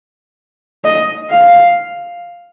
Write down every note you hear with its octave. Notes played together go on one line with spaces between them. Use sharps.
D#5
F5